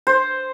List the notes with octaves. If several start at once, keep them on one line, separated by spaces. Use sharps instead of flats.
C5